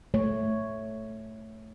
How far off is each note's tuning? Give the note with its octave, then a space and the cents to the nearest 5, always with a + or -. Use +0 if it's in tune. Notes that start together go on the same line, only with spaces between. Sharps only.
A3 +0 C#5 +0